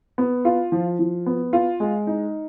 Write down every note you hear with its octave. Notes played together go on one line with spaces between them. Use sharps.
B3
F4
F3
F3
B3
F4
G#3
D#4